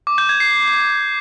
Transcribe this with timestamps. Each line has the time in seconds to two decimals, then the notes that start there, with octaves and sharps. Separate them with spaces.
0.07 D6
0.18 G6
0.29 G#6
0.40 C7